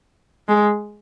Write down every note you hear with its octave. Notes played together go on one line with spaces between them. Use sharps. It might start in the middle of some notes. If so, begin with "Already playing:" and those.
G#3